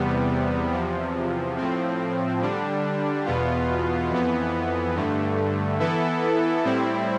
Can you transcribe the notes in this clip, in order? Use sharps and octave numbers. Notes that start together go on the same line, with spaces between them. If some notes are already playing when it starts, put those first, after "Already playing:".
Already playing: E2 C3 G3 B3
E2 C3 F3
A2 F3 C4
D3 G3 D4
E2 B2 B3 F4
F2 E3 B3
G2 D3 A3
E3 B3 E4 A4
A2 G3 C4 E4